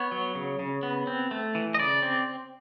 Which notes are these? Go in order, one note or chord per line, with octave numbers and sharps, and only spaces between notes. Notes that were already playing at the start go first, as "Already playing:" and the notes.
Already playing: B3 C#5
F#3
C#3
C#3
B3
C4
A3
E3
D#5
C#3 D5
C4